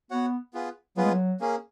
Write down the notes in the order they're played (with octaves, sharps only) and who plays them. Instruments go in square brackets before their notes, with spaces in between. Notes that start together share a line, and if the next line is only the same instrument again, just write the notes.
[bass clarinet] B3 [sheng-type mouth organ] F#4 C#5 F#5
[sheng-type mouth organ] B3 F4 G#4 B4
[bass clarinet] F#3 [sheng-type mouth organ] B3 F4 G#4 B4
[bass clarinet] G#3
F#3
[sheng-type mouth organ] A#3 C#4 G#4